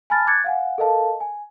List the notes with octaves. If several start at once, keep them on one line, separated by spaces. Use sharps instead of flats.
G#5 A5 B5 F6 A6
D6 F#6 G#6 A6 C#7
F5 F#5 G#5
A4 A#4 D#5 F5 A5
G#5